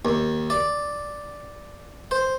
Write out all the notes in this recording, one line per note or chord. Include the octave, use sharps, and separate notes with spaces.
D#2
D5
C5